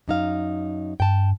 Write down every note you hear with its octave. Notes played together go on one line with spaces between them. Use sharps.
F#2 D#4 F5
G2 G5 A5